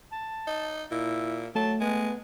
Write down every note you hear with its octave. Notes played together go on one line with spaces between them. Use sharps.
A5
D#4
A#2 E4
F#3 A3 A5
G#3 B3